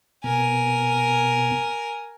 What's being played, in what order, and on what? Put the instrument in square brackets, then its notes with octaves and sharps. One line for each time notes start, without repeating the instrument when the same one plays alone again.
[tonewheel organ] B2 [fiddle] A#4 G#5